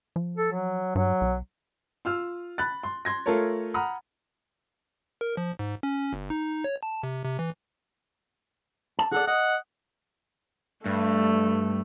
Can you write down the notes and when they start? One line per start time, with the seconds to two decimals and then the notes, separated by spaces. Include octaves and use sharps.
0.16 F3
0.37 A4
0.52 F#3
0.95 G2 F#3
1.21 B1
2.05 F4 E6 F6
2.58 B5 F#6 A6
2.83 C6
3.05 C6 G#6 A#6
3.26 A3 F4 A4 A#4 C#5
3.74 F#5 A#5 B5 D#6 F6
5.21 A#4
5.37 F3
5.59 G#2
5.83 C#4
6.13 G1
6.30 D#4
6.64 C#5
6.83 A5
7.03 C3
7.24 C3
7.39 E3
8.99 A5
9.12 G#4 A4 D5 F#5
9.27 D#5 F#5
10.86 G2 A3